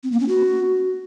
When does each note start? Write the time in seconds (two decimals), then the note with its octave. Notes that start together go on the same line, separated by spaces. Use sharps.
0.04 C4
0.12 A#3
0.20 C#4
0.29 F#4